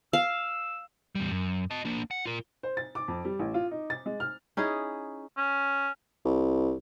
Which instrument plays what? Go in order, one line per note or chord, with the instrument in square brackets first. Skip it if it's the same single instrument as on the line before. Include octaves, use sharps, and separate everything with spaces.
[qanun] F5 [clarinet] E6
[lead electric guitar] E2 G3
F#2
D#5 A5
A#3 D4
F#5
F4 A#4
[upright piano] C5
A6
D6
F2
G3
A1
F4
D#4
A6
G#3
F6
[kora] C#4 D#4 E4 G#4
[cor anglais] C#4
[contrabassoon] C2